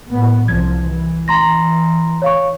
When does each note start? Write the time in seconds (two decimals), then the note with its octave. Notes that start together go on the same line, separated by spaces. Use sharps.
0.12 A2 B3
0.48 C2 F3 G#6
0.87 E3
1.28 A#5 C6 A#6
2.22 C#5 F5 C#6